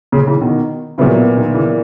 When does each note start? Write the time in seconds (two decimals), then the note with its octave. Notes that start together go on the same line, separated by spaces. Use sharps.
0.12 A#2 C#3
0.27 C#3 E3
0.41 B2 D#3
0.98 A#2 C#3 E3 F#3 B3 E4 A#4
1.18 B2
1.36 B2 D#3
1.55 C#3 E3